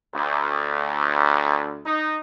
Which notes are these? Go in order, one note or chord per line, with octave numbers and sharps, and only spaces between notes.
D2
D#4